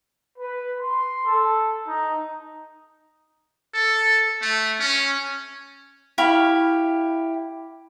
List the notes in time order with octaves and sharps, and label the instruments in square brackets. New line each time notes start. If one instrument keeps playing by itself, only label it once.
[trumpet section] B4
C6
A4
D#4
[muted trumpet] A4
A3
C#4
[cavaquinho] E4 G4 F5 C#6